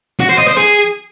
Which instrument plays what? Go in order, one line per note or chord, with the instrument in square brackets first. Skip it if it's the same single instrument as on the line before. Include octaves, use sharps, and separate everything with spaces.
[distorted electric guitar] F#4
C5
D#5
C5
G#4